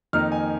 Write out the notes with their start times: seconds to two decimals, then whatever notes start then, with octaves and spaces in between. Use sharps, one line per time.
0.13 F2 D#3 A#3 D#4 F6
0.32 G#5